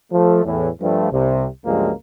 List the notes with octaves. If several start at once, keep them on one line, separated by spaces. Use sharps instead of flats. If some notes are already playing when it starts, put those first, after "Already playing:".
F3 A3
E2 A2 E3
G2 F3 A3
C2 C3
C#2 G2 F3 F#3 G#3 A#3